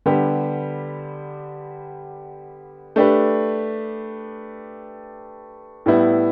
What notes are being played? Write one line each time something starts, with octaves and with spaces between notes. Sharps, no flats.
D3 G3 B3 G4
A3 D4 G4 B4
A2 G3 B3 E4